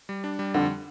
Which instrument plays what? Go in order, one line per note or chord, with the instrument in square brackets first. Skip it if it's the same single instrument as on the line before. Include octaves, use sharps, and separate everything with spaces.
[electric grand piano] G3
D4
G3
[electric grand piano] F2 [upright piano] D3